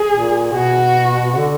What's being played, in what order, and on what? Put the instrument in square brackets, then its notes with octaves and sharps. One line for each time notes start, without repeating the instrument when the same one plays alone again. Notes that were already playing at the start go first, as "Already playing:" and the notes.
Already playing: [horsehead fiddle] G#4
[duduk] A#2
[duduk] B2 [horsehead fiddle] F#4
[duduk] D3